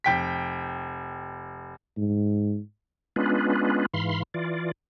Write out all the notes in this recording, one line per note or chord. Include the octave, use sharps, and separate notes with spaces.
F1 G5 B6
G#2
G#3 B3 C#4 D4 F4 B4
G#2 E3 F5 B5 C6
E3 F4 D5